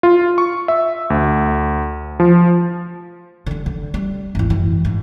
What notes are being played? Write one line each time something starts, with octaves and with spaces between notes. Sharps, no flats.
F4
C#6
E5
D2
F3
D3 G3
D3
G3
G#1 E2
F#2 E3
G#2